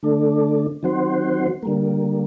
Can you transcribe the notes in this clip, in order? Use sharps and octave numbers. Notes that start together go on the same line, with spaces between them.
D3 A3 D4
D#3 F#3 C4 F#4 C5
D3 G3 A#3